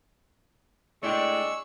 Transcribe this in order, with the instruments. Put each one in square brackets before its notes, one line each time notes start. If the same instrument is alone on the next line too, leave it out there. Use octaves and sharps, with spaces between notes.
[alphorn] G#3 [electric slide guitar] A3 E4 G5 [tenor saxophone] D4 [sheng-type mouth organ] C#6 E6